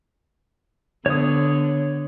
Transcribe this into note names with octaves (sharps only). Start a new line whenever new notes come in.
D3 B3 C#5 D#6